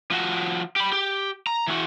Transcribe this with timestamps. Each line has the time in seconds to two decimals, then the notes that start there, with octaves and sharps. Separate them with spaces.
0.11 F3 F#4
0.76 G4 B5
0.92 G4
1.47 A#5
1.67 E3 F#4